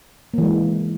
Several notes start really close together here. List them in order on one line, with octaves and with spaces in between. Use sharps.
A#3 E3 G#3